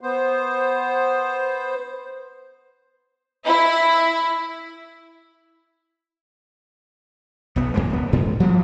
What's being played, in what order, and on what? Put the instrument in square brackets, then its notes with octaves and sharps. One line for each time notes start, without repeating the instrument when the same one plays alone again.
[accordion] B3 C5
[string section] E4
[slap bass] B1 B3
D#2 G#3 A#3
D1 B3
D2 G#2
F3 G3 A#3